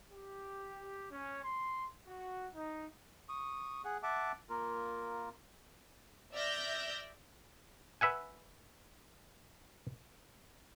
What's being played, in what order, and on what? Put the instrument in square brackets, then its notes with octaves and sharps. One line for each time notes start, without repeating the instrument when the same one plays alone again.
[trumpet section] G4
C#4
C6
F#4
D#4
[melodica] C#6 D#6
G#4 F#5
E5 F#5 A5 D6
A#3 F4 A#4
[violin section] D5 E5 E6 F6 G6 A#6
[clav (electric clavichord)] B4 E5 F#5 G#5